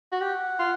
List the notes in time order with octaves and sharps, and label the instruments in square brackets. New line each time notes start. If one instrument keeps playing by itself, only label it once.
[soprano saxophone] F#4
[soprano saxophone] G4 [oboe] F#5
[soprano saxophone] F4